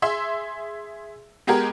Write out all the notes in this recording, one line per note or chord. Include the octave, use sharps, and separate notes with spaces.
G#4 E5 C6 E6
G#3 B3 G4 G#4 A#4